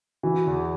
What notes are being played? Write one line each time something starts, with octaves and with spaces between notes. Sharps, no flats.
E3 F#4
E2